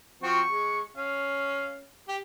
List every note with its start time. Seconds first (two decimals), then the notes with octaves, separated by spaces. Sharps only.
0.23 F3 C4 F#4 C#6
0.48 G#3
0.97 C#4 F5
2.08 G4